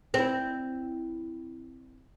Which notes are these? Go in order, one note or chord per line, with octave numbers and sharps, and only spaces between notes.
C4 E4